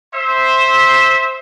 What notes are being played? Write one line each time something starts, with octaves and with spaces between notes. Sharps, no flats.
C5 E5